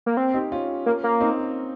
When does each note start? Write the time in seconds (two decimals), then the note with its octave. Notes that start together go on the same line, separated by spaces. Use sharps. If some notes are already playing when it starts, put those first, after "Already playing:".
0.06 A#3
0.17 C4
0.34 D#4 G4
0.52 C#4 F4
0.86 A#3
1.04 A#3
1.21 C4 D#4